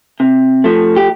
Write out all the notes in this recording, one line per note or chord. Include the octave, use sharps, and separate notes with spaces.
C3
F3 A3
G4